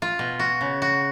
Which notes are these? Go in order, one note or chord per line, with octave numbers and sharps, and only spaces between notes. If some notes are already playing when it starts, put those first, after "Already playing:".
F4
B2
F#4
C#3
F#4